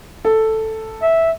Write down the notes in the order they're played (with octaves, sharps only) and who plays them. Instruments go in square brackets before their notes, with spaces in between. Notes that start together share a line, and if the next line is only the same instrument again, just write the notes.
[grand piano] A4
[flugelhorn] E5